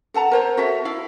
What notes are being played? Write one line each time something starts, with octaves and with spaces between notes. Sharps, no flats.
A4 F#5 A5 A#5
A#4 C5 C#5
F#4 A4 E5
E4 F5